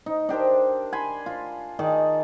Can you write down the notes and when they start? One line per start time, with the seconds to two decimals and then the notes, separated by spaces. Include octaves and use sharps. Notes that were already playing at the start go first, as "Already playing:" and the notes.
0.06 D#4
0.29 D4 G4 A#4 C5
0.93 G#5 B5 C6
1.26 F4
1.79 D#3 G#4 D5 A5